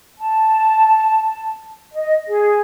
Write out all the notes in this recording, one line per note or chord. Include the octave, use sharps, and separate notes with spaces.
A5
D#5
G#4